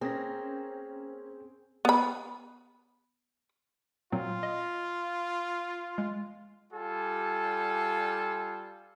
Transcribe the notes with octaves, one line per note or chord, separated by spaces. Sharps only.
A#3 C4 C#4 G#4 A#6
B3 B5
A#2 F#3 C4 F4
D#5
G#3
G3 F4 A4 G#5